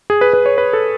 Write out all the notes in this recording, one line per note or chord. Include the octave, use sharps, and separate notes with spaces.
G#4
B4
B4
C#5
B4
A4